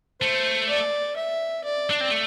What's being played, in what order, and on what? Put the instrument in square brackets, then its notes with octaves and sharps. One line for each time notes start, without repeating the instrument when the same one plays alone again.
[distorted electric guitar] A3 [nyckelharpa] C5
[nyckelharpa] D5
E5
D5
[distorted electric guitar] D4
C4
A3